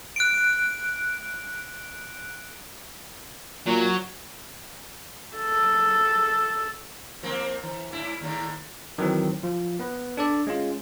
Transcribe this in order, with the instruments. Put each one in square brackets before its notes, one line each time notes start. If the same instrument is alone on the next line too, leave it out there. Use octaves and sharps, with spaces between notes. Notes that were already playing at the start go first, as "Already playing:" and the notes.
[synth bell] F#6 D7
[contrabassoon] A#2 [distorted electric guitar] F#3
[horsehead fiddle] A4
[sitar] F3 A#3 C4
E3
G#2 E4
D#2 A2
[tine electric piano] D#3 E3 F#3 C4
F3 F4
B3 B4
D4 A4 D5
G#3 C#4 F4